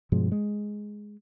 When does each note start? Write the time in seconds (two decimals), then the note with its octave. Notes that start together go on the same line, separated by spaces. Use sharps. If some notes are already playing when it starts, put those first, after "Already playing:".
0.12 G2 B2 F3 G#3
0.32 G#3